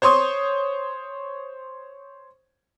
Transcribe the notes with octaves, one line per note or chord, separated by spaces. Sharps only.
C5 C#5 C6 C#6 D#6